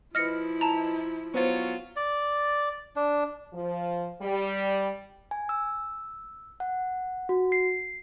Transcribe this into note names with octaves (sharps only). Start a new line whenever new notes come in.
F3 E4 B4 D#5 F6 A#6 C#7
A5 A#5
F#3 B3 C#4 F4 C5
D5
D4
F3
G3
G#5
E6
F#5
F#4
C7